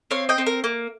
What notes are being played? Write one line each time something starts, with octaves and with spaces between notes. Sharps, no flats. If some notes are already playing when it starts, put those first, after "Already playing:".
C4 C#5 F5
D#5 G5
C4
A#4
A#3